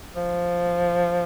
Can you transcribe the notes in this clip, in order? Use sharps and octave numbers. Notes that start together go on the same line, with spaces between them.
F3